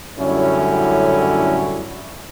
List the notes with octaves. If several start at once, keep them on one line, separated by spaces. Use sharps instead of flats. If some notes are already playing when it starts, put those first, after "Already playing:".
F#2 A2 D3 G3 C#4 E4